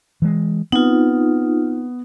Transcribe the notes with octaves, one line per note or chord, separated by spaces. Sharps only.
E3 G#3
B3 C4 D#4 F4